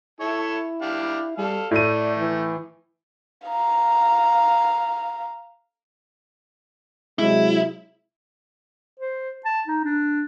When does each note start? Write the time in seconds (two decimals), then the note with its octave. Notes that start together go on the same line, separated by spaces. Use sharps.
0.20 E4 A4 C#5 E5
0.82 D4 G4 F5
1.38 G3 A4 F5
1.71 A2 A3 D5 D#7
2.17 E3
3.46 F5 A#5
7.19 C3 F#3 G#3 E4
9.00 C5
9.45 A5
9.67 D#4
9.84 D4